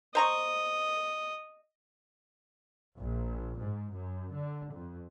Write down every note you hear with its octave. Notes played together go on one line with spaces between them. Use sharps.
C5 D#5 A#5 C#6
A#1
G#2
F#2
D3
F2